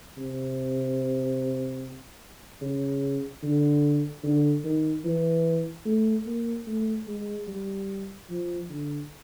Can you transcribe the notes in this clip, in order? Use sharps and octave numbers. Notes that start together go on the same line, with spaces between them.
C3
C#3
D3
D3
D#3
E3
A3
A#3
A3
G#3
G3
F3
D3